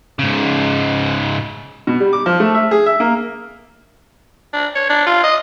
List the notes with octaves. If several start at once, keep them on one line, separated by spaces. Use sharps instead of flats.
G#2 C#3
B2
G3
D6
F3
A3
E5
G#4
E5
A#3
D4
C#5
D4
F4
D#5